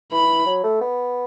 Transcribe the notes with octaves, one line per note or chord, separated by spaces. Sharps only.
E3 B5
F#3
A3
B3